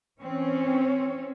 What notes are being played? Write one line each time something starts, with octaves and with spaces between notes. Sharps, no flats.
E3 C4 C#4 C#5